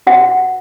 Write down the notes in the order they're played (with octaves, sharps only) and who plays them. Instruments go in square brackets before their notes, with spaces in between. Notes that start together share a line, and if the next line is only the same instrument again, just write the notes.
[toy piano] F#4 B4 F#5